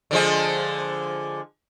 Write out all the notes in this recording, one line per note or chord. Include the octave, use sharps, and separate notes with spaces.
D3 F3 G#3